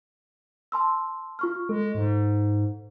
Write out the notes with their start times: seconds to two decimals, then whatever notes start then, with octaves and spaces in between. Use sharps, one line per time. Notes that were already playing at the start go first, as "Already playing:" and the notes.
0.72 A5 C6 E6
1.39 F4 C#6 F6
1.69 G#3 A4
1.95 G#2